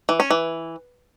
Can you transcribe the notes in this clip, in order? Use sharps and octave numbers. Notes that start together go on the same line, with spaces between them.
E3
C#4
E3